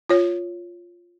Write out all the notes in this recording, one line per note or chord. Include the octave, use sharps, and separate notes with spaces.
F4 C#5